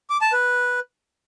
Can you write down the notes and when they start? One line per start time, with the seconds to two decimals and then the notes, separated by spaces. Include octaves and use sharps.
0.10 D6
0.21 A5
0.33 B4